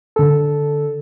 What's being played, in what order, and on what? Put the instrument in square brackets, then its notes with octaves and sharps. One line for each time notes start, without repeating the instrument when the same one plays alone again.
[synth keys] D3 A4